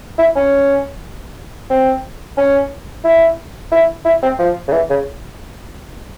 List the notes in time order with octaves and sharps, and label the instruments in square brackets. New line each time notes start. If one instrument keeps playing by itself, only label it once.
[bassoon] E4
C#4
C4
C#4
E4
E4
E4
C4
F3
C#3
E3
C#3